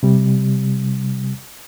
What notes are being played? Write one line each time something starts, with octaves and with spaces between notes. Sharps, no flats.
C3 G3